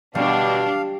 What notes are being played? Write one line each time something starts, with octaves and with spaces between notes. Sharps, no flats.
B2 G3 D4 F5